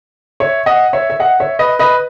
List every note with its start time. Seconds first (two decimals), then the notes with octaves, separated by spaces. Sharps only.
0.40 C#5 E5
0.66 D#5 F#5
0.93 C#5 E5
1.10 E5
1.19 D#5 F#5
1.40 C#5 E5
1.59 B4 D#5
1.79 B4 D#5